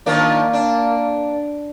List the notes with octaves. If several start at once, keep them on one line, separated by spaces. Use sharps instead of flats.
D#3 F3 A#3 D4
D4